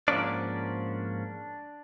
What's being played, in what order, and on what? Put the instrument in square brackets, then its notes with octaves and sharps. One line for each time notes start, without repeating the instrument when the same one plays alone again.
[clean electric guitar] G#2 F3 A#3 C#4 D4 D5